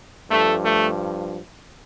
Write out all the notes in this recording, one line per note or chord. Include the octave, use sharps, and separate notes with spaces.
G2 F3 A3
A3